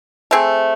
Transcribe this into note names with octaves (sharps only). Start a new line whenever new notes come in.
A3 C4 G#4